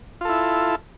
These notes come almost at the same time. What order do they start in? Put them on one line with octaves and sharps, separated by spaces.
F4 A4 E4